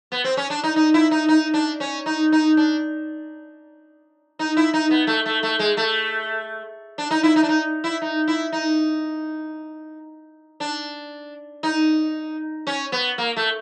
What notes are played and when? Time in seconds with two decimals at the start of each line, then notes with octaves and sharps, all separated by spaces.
0.12 B3
0.24 C4
0.37 C#4
0.50 D4
0.63 D#4
0.76 D#4
0.94 E4
1.11 D#4
1.28 D#4
1.54 D4
1.80 C#4
2.06 D#4
2.32 D#4
2.57 D4
4.39 D#4
4.57 E4
4.73 D#4
4.91 B3
5.07 A3
5.26 A3
5.43 A3
5.59 G#3
5.77 A3
6.98 D4
7.11 D#4
7.23 E4
7.36 D#4
7.43 D4
7.49 D#4
7.84 E4
8.02 D#4
8.28 E4
8.52 D#4
10.60 D4
11.63 D#4
12.67 C#4
12.92 B3
13.18 A#3
13.36 A3